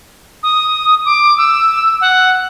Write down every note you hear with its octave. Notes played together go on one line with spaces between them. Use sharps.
D#6
D6
E6
F#5